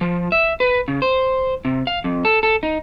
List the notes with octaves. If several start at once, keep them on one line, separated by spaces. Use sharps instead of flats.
F3
E5
B4
C#3
C5
C3
F5
F2
A4
A4
D#4